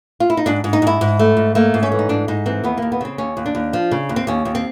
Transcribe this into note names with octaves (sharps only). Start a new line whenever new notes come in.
F4
E4
D#4
G#2 D4
G#2
D#4
G#2 E4
G#2
A3
G#2
A3 A#3
G#2
C#4
E3
D#4
G#2 D4
G#2 D#4
E3 C4
D#2 B3
D#2 A#3
B3
C#3 C4
D#2 C#4
D#2
D4
D#2
F3
C#3
D#2
C4
D#2 C#4
D#2
C4